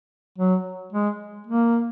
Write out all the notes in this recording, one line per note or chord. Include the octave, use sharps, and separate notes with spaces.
F#3
G#3
A#3